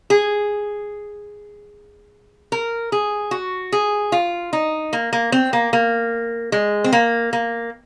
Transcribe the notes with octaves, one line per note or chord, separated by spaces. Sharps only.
G#4
A#4
G#4
F#4
G#4
F4
D#4
A#3
A#3
C4
A#3
A#3
G#3
C4
A#3
A#3